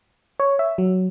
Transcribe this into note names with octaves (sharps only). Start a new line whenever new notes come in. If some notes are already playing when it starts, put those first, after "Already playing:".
C#5
E5
F#3